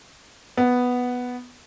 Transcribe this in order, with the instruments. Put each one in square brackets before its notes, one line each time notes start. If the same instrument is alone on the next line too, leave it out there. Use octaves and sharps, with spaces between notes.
[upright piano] B3